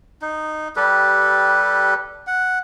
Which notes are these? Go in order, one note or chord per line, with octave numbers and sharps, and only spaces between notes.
D#4
G3 G4 A4 B4
F#5